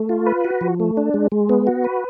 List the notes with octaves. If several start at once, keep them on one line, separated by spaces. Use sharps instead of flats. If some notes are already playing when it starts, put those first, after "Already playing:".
Already playing: A3
F4
B4
F#4
F3
A3
D4
G#3
G#3
B3
F#4
B4